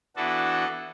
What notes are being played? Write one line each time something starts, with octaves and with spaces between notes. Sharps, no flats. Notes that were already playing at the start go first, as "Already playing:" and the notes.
E3 B3 D4 F#4 A4